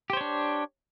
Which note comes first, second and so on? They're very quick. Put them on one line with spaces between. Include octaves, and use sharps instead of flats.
G4 C5 C#5 D4